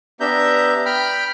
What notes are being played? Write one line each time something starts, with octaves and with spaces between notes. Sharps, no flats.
B3 D4 G4 E5 A#5 G6
G5 B5 F6